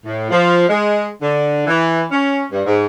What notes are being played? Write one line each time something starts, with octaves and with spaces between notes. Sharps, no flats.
A2
F3
G#3
D3
E3
C#4
G2
G#2